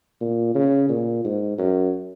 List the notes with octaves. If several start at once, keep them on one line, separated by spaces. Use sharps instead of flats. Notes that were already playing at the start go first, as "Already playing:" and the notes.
A#2
C#3
A#2
G#2
F#2